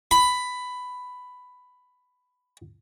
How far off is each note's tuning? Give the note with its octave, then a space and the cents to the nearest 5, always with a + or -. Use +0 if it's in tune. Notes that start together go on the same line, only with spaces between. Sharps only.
B5 +10